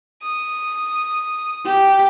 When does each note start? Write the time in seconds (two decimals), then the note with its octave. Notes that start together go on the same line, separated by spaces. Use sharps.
0.23 D#6
1.66 G4